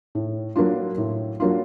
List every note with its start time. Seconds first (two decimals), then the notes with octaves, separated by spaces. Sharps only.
0.15 A2
0.56 F#3 A#3 D4 F4
0.98 A2
1.40 F#3 A#3 D4 F4